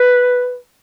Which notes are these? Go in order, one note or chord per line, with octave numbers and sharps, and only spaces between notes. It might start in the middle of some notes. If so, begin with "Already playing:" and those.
Already playing: B4